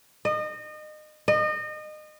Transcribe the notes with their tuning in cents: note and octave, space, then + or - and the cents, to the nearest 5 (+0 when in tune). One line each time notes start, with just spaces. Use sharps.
D#5 -30
D#5 -30